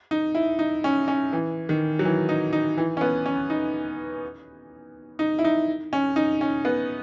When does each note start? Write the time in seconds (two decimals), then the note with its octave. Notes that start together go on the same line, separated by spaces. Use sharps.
0.11 D#4
0.35 E4
0.59 D#4
0.84 C#4
1.08 C#4
1.33 E3
1.69 D#3
1.99 F#3
2.05 E3
2.29 D#4
2.53 D#4
2.77 E3
2.97 C#4
3.01 B3
3.26 C#4
3.50 D#4
5.19 D#4
5.39 E4
5.44 D#4
5.93 C#4
6.16 D#4
6.41 C#4
6.65 B3